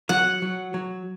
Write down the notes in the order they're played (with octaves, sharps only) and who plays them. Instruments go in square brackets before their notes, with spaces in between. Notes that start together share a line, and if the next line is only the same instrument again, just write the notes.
[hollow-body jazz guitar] F#3 [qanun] F#5
[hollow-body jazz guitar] F#3
F#3